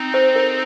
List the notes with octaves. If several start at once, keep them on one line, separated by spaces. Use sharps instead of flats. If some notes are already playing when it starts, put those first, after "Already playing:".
Already playing: C4 D#4
C5
A#4